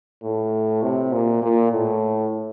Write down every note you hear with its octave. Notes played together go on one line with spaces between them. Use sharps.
A2
C3
A#2
A#2
A2